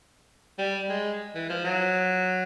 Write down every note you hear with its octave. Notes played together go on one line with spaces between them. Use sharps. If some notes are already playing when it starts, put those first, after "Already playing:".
G3
G#3
E3
F3
F#3